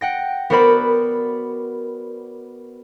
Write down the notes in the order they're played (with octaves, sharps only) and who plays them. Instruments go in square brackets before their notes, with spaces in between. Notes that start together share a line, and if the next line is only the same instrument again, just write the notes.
[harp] F#5 G5 A#6
B3 F#4 A#4 C5 D5 B5